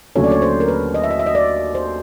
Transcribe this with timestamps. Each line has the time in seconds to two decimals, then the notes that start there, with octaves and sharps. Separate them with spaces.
0.16 D#2 D3 F#3 A3 C#4 C#5
0.24 D5
0.31 C#5
0.42 C5
0.60 A#4
0.68 B4
0.94 D#5
1.04 E5
1.11 D#5
1.19 E5
1.26 D#5
1.35 D5
1.75 C5